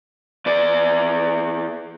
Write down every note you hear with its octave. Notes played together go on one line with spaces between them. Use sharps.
E2 D5